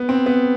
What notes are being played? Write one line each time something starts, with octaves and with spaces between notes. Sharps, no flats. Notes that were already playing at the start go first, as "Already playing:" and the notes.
Already playing: B3
C4
B3